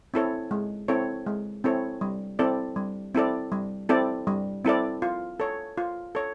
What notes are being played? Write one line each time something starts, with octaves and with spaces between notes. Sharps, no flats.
C4 E4 A4 C#5
G#3
C4 E4 A4 C#5
G#3
C4 E4 A4 C#5
G3
C4 E4 A4 D5
G3
C4 E4 A4 D5
G3
C4 E4 A4 D5
G3
C4 E4 A4 D5
F4
A4 C#5
F4
A4 C#5